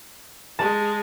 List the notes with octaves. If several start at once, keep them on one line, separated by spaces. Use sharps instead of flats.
G#3 A5